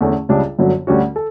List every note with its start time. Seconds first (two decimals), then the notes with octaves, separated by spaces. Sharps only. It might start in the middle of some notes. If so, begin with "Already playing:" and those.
0.01 E2 D3 A3 C#4
0.29 C#2 C#3 G3 D4
0.59 G1 F#2 D3 F#3
0.87 D2 D3 G3 C#4 F#4
1.16 A4